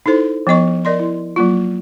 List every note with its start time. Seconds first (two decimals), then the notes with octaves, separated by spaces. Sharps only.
0.06 D#4 E4 A4 C5
0.47 F3 B3 D#5 C#6
0.85 A#4 D5 D#5 C6
1.00 E4
1.36 F#3 A#3 F4